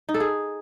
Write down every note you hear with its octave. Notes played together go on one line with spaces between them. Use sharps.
D#4
A4
G#4